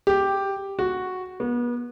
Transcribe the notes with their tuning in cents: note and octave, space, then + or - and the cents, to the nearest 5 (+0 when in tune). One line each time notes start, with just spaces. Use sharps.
G4 +0
F#4 -5
B3 -35